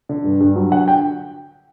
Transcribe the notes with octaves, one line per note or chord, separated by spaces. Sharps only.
D3
G2
G2
F#3
D3 F#5
G5